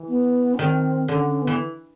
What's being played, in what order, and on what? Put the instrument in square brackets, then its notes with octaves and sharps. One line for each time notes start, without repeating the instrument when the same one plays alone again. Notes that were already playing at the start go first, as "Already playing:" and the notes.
Already playing: [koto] E3
[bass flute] B3
C#4
[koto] D#3 [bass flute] C4
[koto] D3 [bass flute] C#4
[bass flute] C#4
B3
[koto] E3